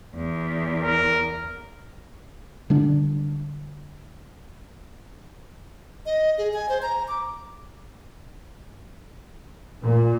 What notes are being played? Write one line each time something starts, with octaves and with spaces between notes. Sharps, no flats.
E2
A#4
D3 G3 D4
D#5
G#4
G#5
C5
A#5
D6
A#2